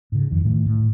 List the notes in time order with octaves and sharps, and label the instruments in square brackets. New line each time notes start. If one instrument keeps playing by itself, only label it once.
[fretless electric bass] G#2 C#3
F2 D#3
A2 D#3 A3
A2